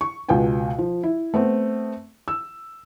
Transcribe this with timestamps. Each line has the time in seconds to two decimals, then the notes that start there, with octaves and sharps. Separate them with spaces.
0.01 C#6
0.29 C#2 B2 B3 G5 G#5
0.78 F3
1.03 E4
1.34 A3 B3 C4
2.28 E6